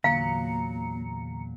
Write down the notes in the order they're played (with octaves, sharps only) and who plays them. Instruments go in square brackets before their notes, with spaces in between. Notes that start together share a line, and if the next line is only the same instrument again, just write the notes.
[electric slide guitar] E2 A#2 F#3 [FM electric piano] D3 A#5 C#7 [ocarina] A#3 [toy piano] F5